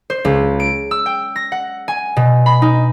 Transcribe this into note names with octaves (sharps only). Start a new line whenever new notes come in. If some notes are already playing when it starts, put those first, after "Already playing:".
C5
C#2
D7
E6
G5
A#6
F#5
G#5
B2
B5
D#4